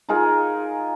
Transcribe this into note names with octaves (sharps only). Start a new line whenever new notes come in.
D#4 F4 G#4 A#4